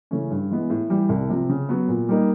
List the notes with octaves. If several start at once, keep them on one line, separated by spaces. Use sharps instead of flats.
C#3 E3 A3 C#4
G2
E3 G#3 B3
A2
E3 G3
C2
C3 F3
C#3
F#3 B3
A#2
G3 A#3 D#4